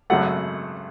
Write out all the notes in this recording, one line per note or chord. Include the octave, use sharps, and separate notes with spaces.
G#1 F#2 C#3 F#3 A3 F#5